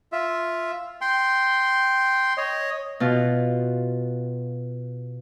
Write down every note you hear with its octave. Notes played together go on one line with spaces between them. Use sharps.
F4 E5
G5 C6
C#5 D#5
B2 F4